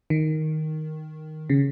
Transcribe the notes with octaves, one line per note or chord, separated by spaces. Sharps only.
D#3
C#3